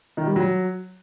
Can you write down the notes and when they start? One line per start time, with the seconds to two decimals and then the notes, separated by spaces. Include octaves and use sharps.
0.17 D#3
0.27 G3
0.36 F#3